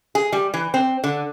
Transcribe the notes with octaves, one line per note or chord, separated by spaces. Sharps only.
G#4
G3
E3
C4
D3